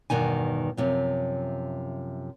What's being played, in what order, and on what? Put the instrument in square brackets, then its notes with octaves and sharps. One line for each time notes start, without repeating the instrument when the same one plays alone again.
[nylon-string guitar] E2 G2 B2 D#3 G#5
F#2 C3 F3